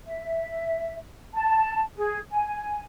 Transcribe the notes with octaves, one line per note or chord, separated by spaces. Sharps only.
E5
A5
G#4
G#5